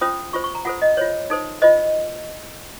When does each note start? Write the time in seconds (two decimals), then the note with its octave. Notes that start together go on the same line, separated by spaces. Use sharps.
0.01 C#4 F4 C5 D#6
0.33 F4 C5 C#6
0.44 C#6
0.55 A#5
0.65 F4 A4 C5 F#5
0.82 D#5
0.97 F4 C5 C#5
1.30 D#4 A4 C5
1.62 F4 C5 D#5